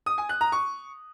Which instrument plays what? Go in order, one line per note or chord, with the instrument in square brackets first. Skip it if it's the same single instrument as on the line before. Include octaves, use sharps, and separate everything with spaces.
[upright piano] D#6
G#5
F#6
A#5
C#6